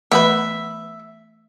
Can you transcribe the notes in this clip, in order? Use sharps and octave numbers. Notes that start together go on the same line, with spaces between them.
E3 A3 B3 F#4 B4 E5 G#5